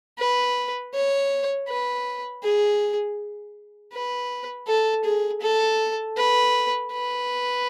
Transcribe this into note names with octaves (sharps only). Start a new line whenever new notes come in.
B4
C#5
B4
G#4
B4
A4
G#4
A4
B4
B4